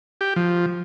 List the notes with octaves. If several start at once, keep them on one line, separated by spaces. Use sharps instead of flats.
G4
F3